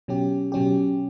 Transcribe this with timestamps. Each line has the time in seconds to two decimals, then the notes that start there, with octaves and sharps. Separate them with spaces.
0.08 B2 F#3 C#4 G4
0.52 B2 F#3 C#4 G4